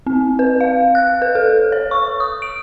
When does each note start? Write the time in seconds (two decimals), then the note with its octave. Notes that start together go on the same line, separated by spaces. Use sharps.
0.07 C4
0.39 B4
0.61 F5
0.95 F#6
1.22 B4
1.35 A4
1.72 C#5
1.91 C#6
2.20 D#6
2.42 D7